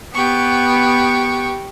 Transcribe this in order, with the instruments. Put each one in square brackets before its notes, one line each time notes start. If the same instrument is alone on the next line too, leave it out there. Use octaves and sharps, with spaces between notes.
[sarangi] B3 [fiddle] G4 C#6